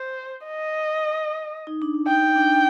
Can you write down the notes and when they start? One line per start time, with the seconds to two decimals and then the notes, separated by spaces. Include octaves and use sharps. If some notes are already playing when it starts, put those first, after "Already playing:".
Already playing: C5
0.46 D#5
1.67 D#4
1.82 D4
1.94 D#4
2.08 D#4 G5
2.35 D4